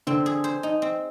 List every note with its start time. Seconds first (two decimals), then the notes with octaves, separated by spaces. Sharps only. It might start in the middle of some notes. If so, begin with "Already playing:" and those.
0.07 D3 C4
0.26 G#4
0.44 C5
0.63 D#4
0.82 C4